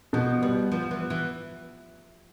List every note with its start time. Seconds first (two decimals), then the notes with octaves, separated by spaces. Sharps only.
0.13 B2 F3
0.42 G3 B3
0.72 F3 B3
0.91 E3
1.01 B3
1.10 E3